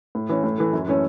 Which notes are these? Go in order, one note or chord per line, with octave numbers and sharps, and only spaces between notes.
A2
E3 C#4
A2
E3 A3
F#2
E3 A3 C#4 A4